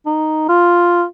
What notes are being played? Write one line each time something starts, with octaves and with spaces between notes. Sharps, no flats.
D#4
F4